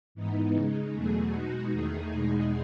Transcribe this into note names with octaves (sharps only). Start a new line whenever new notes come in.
G#2 E3 B3 D#4
C#3 G#3 D#4
E2 B2 F#3 A3 G#4
B2 G#3 D#4 F#4
E2 D#3 A3 D#4 G#4
E2 B2 G#3 D#4